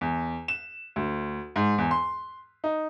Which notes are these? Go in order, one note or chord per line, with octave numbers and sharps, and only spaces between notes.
E2
E7
D2
G#2
E2
C6
D#4